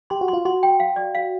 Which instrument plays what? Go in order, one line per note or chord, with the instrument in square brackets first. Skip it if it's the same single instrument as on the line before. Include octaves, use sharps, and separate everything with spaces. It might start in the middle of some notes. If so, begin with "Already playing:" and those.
[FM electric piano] G4 [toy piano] C6
[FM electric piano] F#4
[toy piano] C6
[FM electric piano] F4
[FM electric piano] F#4 [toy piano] C6
[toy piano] G5
F5
D5
F5